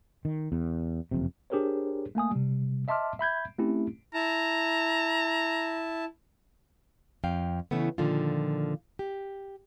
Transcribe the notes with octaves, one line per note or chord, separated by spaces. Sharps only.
D#3
E2
F#1 F2 C3
D4 G4 G#4 A#4 C5 C#5
A3 A#3 G#5 D#6
C3 G3
D#5 E5 A5 C6 D6 F6
E5 B5 G6 G#6
A3 C4 C#4 E4 G4
E4 A5 A#5
F2 F5 G5
C#3 E3 A3 B3
A#2 D3 D#3 F3 F4
G4